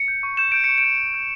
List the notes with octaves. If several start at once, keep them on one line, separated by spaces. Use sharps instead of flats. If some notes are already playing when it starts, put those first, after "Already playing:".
Already playing: C#7
G6
C#6
G6 E7
G6 D7
C#6 C#7
D7
G6
G6
G6